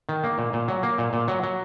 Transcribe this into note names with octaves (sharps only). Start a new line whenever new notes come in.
D#3
A#3
A#2
A#2
F#3
A#3
A#2
A#2
F#3
F#3